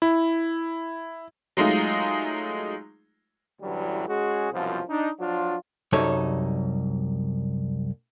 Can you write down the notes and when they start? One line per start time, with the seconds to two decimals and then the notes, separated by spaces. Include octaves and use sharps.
0.02 E4
1.57 F#3 G#3 A3 D#4 F4
3.61 A1 D2 D3 E3 F#3 G3
4.08 G#3 C#4 F#4 G#4
4.53 C2 F#2 B2 F3
4.88 D4 D#4
5.20 F3 F#3 D4 F4
5.93 C2 F#2 G3 D#4 A4 C#5